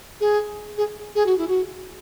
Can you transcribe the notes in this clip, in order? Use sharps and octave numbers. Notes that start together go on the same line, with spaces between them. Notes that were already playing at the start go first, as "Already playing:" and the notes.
G#4
G#4
G#4
F#4
E4
F#4